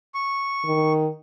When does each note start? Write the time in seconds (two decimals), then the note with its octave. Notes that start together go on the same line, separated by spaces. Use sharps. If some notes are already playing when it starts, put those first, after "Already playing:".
0.15 C#6
0.65 D#3